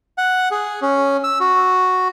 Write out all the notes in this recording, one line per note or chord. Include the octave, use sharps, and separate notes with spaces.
F#5
G#4
C#4
E6
F#4